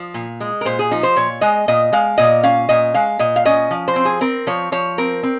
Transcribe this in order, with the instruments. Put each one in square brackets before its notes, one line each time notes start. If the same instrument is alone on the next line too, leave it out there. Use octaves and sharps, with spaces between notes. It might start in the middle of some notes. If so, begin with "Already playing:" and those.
Already playing: [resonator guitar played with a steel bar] F3
A#2
G#3
A#4
A#2 C5
G#4
F3 D#4
C5
A#2 C#5
G#3 D#5
A#2 D#5
G#3 F5
A#2 D#5
C#4 F5
A#2 D#5
G#3 F5
A#2 D#5
F5
C#4 D#5
F3
C5
C4
G#4
C4 A#4
F3 C#5
F3 C#5
C4 A#4
C4